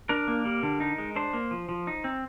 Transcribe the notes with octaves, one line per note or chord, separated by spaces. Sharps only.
D4 A#4
A#3
G3
D3
D#4
G#3
D4 C5
A#3
F3
F3
D#4
C4